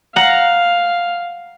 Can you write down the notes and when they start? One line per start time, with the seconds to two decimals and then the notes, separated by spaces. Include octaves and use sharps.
0.16 F5 F#5 A#5